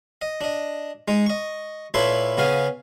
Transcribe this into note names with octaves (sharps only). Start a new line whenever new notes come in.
D#5
D4 D#5
G#3 D#4
D#5 C#6
A#2 E4 A4 B4 C#5 C6
C#3 B3 C#4 G#4 F5